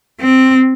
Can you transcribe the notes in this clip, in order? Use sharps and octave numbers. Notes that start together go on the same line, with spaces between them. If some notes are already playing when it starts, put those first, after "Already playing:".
C4